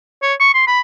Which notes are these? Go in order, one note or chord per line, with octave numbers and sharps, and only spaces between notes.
C#5
C#6
C6
B5